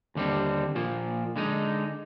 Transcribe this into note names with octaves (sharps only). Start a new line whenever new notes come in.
D#2 D3 G3 C4
A#2 F3 A#3
D3 G#3 D#4